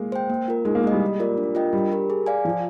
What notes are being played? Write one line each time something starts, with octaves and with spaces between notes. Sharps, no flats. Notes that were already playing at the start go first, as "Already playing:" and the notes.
Already playing: G#3 A#3
C5 G5
A#3
F4 A#4
G#3 D#4
A#3
G#3 G#4 D#5
G3
A#3
F4 A#4 D5
D4
F4 A#4 D#5 G5
G3 D4
G4 A#4
G#4
D5 F5 G#5
F3 F4